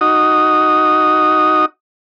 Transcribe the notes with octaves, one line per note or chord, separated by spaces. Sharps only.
D#4 F#4 D#6